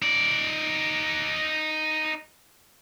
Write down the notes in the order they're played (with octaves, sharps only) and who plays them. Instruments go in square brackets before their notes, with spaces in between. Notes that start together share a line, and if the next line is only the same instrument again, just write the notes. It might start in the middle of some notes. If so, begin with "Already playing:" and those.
[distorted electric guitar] D#4 D5